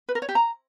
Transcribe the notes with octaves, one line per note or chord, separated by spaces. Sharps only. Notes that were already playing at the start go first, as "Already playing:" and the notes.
B4
A#4
C#5
G4
A#5